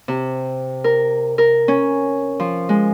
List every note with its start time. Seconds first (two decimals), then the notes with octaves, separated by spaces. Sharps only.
0.08 C3
0.84 A#4
1.38 A#4
1.68 C#4
2.40 F3
2.69 G#3